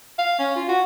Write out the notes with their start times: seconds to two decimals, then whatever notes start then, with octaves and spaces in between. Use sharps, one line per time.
0.19 F5
0.39 C#4
0.56 F4
0.69 F#4